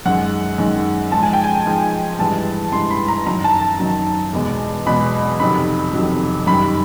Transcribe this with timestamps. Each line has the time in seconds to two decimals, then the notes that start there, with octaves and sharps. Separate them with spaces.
0.06 F#2 D#3 G#3 F#5
0.58 F#2 D#3 G#3
1.12 G#2 F3 G#3 A5
1.23 G#5
1.33 G5
1.44 G#5
1.66 G#2 F3 G#3
2.19 G2 E3 G#3 A5
2.72 G2 E3 G#3 C6
2.90 B5
3.08 A#5
3.26 F#2 D#3 F#3 A#5
3.44 A5
3.61 A5
3.80 F#2 D#3 F#3
4.33 E2 B2 G#3
4.86 E2 B2 G#3 B5
5.40 F2 C3 D#3 F#3 B5
5.93 F2 C3 D#3 F#3
6.47 F#2 D#3 G3 B5